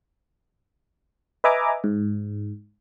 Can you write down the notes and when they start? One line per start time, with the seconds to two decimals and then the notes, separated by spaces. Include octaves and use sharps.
1.44 B4 D#5 E5 G#5 A#5 D6
1.84 G#2